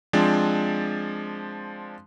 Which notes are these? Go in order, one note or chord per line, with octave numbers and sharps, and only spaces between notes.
F3 G#3 C4 D4